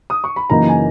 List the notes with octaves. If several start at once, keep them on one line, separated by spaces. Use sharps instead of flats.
D#6
C#6
B5
F#1 F#2 E3 A#3 D#4 A#5
G#5